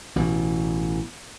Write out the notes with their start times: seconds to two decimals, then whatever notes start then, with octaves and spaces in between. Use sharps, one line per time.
0.16 A1 B2 E3